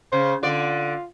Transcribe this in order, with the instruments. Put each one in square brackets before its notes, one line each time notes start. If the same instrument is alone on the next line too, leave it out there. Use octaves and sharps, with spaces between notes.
[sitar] C#3 [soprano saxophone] C5
[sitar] D3 D5 [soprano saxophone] F4